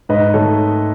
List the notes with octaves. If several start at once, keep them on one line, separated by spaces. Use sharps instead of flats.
G#2 B4 D#5
D#3 A3 A4 C#5